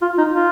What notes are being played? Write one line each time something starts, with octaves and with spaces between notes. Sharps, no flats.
F4
D#4
F4